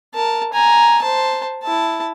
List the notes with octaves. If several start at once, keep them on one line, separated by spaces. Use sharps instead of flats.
A#4 A5
G#5 A#5
C5 A5
E4 A5